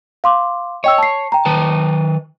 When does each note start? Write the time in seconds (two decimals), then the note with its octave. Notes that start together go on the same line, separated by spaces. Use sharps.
0.24 F5 C6 D6
0.84 C#5 D#5 G5 E6
0.98 A5 C7
1.32 G5 A#5
1.45 D#3 B4 A5